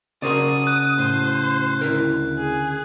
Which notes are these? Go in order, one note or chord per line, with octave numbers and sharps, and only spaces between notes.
C#3 F#4 A#4 C5 D5 D#6
F#6
A2 C5
D2 E4 A#4
G#4